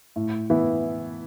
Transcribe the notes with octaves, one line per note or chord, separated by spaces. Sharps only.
A2
E3 B3 E4